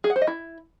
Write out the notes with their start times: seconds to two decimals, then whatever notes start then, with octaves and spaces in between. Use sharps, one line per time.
0.04 G#4
0.10 F#5
0.16 C5
0.22 D#5
0.27 E4